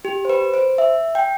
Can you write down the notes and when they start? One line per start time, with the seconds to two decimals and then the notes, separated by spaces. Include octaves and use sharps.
0.05 G4
0.25 C5
0.30 B4
0.54 C5
0.78 E5
1.15 G5